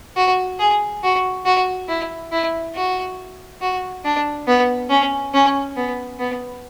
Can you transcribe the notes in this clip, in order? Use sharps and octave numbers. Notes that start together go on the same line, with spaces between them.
F#4
G#4
F#4
F#4
E4
E4
F#4
F#4
D4
B3
C#4
C#4
B3
B3